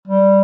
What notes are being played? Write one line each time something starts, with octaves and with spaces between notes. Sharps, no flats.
G3